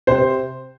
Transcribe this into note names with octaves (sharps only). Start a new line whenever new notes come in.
C3 C5